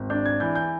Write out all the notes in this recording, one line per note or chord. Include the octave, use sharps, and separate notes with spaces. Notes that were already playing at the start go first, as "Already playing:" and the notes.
Already playing: G#1
D4 G6
G#6
E3 G6
G6